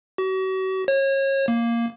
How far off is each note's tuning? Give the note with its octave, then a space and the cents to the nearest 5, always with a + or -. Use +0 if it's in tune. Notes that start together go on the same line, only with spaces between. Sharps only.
F#4 +40
C#5 -30
A#3 +0